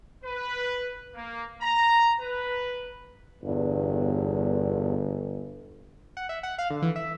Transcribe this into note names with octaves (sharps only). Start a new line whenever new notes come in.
B4
A#3
A#5
B4
G1 E2 G2
F#5
E5
F#5
F5
D3
E3
E5